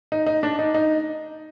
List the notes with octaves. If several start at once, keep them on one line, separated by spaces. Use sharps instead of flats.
D#4
D#4
D4
D#4
D#4